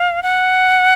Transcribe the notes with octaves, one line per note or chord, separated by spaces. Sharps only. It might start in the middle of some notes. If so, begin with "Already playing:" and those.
Already playing: F5
F#5